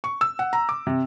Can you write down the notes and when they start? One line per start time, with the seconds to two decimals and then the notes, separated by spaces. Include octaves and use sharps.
0.04 C#6
0.21 E6
0.39 F#5
0.53 A#5
0.69 D6
0.87 C3